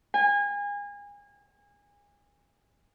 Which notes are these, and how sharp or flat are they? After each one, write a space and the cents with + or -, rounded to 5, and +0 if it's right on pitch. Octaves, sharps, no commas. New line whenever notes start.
G#5 -30